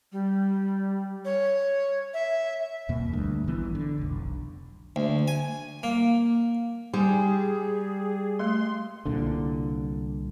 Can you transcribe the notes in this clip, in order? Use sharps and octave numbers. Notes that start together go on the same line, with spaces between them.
G3
C#5
E5
E2 B2 A#3
D2 G2
A1 E3 B3
D3
F1 B1
D2
G#5
A#3
G3 D#4 G#4 G#5
G#3 A3 C6
C2 A#2 D3